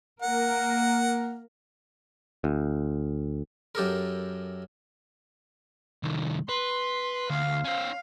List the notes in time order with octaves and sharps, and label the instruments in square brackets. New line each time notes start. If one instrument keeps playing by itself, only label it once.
[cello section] A#3 A#4 [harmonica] F#5
[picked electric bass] D2
[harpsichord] F#2 G4 A4 A#4
[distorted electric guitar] C2 D#3
[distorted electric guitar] B4 [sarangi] C6
[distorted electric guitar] D2 [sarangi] F5
[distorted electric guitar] C#4 C5 [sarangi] F5